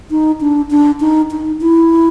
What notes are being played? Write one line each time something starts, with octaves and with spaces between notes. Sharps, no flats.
D#4
D4
D4
D#4
D#4
E4